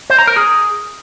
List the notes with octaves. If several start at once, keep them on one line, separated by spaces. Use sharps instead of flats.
C5
A#5
A#4
G#4